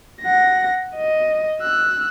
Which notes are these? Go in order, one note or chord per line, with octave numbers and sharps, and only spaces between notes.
F#5 A#6
D#5
E6 F#6